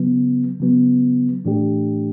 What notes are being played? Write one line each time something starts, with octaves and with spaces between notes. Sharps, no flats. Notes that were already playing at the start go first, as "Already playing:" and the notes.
Already playing: C#3 F#3 B3
C#3 F#3 B3
A2 E3 A3 D4 G4